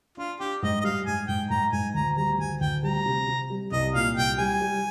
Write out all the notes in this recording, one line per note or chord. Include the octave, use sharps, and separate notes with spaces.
D4 F4
D4 G4
G#2 D#5
D#5
G3 F5
G#2 G#5
G#2 G5
G#2 A#5
G#2 G#5
D2 A#5
G3 A#5
D2 G#5
D2 G5
G3 A#5
C3
C3
G3
C2 D#5
A#2 F5
C2 G5
G3 G#5
G3